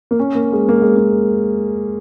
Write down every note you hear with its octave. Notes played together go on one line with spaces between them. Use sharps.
A#3
C#4
A#3
G#3
A#3
G#3
A#3